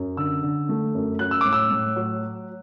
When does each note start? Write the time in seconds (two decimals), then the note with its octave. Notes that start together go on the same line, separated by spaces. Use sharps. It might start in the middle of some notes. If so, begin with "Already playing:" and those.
Already playing: F#2
0.17 D3 E6
0.43 D3
0.69 A3
0.95 F#2
1.19 F#3 F#6
1.31 E6
1.41 A2 D6
1.53 E6
1.70 A2
1.96 F#3